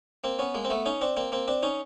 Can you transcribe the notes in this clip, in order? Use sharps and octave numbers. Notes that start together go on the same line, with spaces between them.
A#3 C4
B3 C#4
G#3 A#3
C4
A3 B3
C#4 D#4
C4 D4
A#3 C4
A#3 C4
C4 D4
C#4 D#4